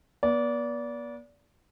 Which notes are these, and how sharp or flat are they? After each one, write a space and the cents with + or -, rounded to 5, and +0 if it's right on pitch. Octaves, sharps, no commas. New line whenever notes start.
B3 -40 D5 -25